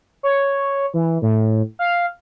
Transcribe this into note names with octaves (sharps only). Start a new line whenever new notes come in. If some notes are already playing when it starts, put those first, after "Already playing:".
C#5
E3
A2
F5